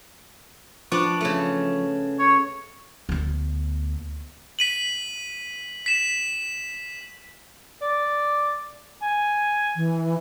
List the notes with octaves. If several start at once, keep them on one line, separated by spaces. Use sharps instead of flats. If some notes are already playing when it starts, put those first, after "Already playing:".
F3 B3 D4 D5 C#6
C#3 A3
C#5
D2 B3
B6 D#7 F#7
B6 E7
D5
G#5
E3